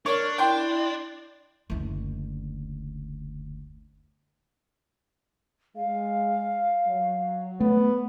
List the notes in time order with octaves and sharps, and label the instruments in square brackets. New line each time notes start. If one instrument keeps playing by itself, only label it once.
[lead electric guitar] D4 [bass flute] A#4 [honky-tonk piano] C#5
[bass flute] E4 [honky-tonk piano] G5 C6
[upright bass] F#1 D2
[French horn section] G#3 [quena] F5
[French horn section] F#3
[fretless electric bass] A3 [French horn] B3